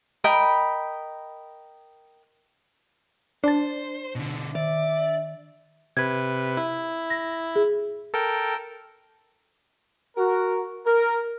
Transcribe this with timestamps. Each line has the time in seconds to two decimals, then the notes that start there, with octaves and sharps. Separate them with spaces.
0.24 A#4 D#5 G5 B5
3.44 D4 C5 D5 A5 A6
4.15 B2 D3
4.55 D#3 D5 E5
5.97 C3 B4 G#6
6.57 E4
7.10 A#6
7.56 G#4
8.14 A4 A#4 G5
10.17 F#4 A#4
10.86 A#4